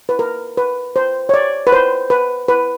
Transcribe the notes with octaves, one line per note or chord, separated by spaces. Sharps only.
B4
A#4
B4
C5
C#5
D5
B4
C5
B4
B4